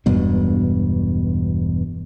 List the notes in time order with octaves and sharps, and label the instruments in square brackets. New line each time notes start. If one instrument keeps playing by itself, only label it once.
[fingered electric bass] E1 G2 B2